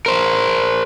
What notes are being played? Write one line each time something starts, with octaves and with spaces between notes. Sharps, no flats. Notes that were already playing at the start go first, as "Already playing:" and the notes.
A#4 C5